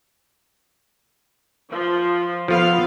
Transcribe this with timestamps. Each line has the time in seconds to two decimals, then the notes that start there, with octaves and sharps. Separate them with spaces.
1.72 F3
2.48 F3 B3 F4 A4 F5